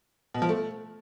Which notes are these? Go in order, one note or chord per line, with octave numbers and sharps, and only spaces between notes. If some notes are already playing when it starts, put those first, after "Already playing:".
B2
F3
A3